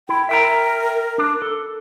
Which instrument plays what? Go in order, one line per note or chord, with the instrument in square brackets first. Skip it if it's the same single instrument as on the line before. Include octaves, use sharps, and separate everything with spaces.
[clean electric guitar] E4 [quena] G5
[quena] A#4 [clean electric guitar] E5 G5 A#5
[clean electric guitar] D4
A4